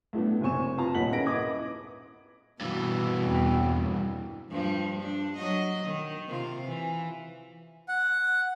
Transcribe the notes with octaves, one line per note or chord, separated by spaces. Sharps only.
A2 A3 B3 D4
F#1 C3 C4 G#5 C#6 E7
F4 B4 A5 A#5
D#1 A#3 D#4 F#5 B6 F#7
G#3 C#4 E4 B4 A#6 D7
B4 D#5 D6 D#6 G#6
G2 B2 E3
E2 G3 C4
G2 F3 G3
D4
F#3 D#5
D#3
C3 F4
E3
F#5